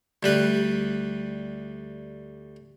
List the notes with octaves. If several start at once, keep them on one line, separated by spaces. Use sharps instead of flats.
D2 G3 B4